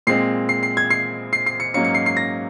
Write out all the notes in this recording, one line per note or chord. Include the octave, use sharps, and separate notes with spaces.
A#2 G#3 C4 C7
C7
C7
G#6
C7
C7
C7
C#7
G#2 F#3 A#3 C#4 C#7
C#7
C7
C7
A#6